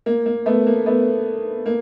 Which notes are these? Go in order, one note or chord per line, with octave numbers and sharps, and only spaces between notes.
A#3
A#3
A3 B3
A#3
A3 B3
A#3